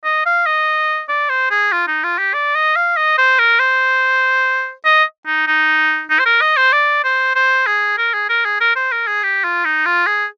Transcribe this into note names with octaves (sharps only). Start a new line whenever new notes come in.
D#5
F5
D#5
D5
C5
G#4
F4
D#4
F4
G4
D5
D#5
F5
D#5
C5
A#4
C5
D#5
D#4
D#4
D#4
C5
A#4
D#5
C5
D5
C5
C5
G#4
A#4
G#4
A#4
G#4
A#4
C5
A#4
G#4
G4
F4
D#4
F4
G#4